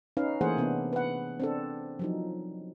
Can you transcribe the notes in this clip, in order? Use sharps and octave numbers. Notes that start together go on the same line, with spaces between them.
C#4 D#4 B4 F5
E3 A3 A#3 G#4 C5 F#5
C3 B3 D4
B4 F#5
C4 D4 A4
F3 F#3 D#4